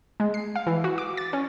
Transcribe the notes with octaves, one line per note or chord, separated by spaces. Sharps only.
G#3
C7
F5
E3
F#4
D6
A6
C#4